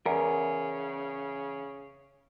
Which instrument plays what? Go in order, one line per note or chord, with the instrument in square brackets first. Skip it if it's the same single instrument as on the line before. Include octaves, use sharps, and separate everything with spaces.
[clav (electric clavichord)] E2 [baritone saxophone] C#3 [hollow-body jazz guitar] A#4